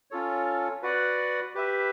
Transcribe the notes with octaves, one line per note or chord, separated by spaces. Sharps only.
C#4 F4 A4 C#5
F#4 B4 D5 F#5
G4 B4 E5